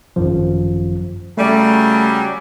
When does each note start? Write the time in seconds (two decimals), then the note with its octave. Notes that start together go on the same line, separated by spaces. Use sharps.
0.16 G#1 F#2 F3
1.38 C#3 F#3 G3 A3